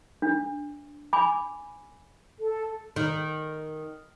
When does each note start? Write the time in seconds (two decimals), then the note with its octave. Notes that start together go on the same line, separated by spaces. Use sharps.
0.22 D4
1.13 G#5 B5 D6
2.39 A4
2.96 D#3